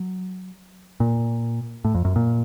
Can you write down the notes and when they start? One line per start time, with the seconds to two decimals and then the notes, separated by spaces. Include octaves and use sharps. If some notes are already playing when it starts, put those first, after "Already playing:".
Already playing: F#3
1.00 A#2
1.85 A2
1.95 F2
2.05 F#2
2.16 A#2